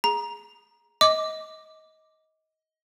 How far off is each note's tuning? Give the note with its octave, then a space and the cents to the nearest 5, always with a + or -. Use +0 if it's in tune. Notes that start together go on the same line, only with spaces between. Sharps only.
G#4 +0 A#5 +20
D#5 +20 D6 +0